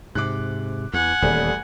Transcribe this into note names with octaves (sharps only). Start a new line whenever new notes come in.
G#2 C3 D6 F#6
E2 F#5 G#5
D#1 E2 G3 A3